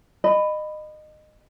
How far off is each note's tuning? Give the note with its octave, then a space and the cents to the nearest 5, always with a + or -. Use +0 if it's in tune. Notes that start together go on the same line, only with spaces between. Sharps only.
D#5 -25 B5 +10